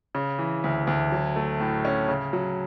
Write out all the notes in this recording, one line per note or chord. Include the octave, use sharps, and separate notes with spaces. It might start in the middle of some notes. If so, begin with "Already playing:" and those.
C#3
E3
D2
D2
F#3
A3
A2
C#4
C#3
F#3